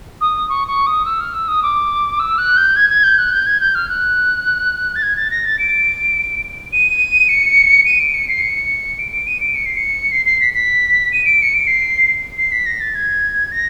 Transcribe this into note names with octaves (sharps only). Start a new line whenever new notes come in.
D#6
C#6
C#6
D#6
E6
F6
E6
D#6
D6
E6
F#6
G6
G#6
G#6
G6
F#6
G6
G#6
G6
F6
F#6
A6
G#6
A6
A#6
A6
D7
D#7
C#7
D#7
D7
C#7
C7
C#7
D7
D7
D#7
D7
C#7
C7
C#7
C7
C7
B6
B6
D#7
D7
C#7
D7
C7
C7
B6
A#6
A6
G#6
A#6